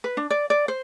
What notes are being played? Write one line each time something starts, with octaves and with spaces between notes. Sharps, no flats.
B4
D4
D5
D5
C5